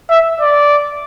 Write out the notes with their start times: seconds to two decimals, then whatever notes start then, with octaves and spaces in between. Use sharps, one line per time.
0.10 E5
0.40 D5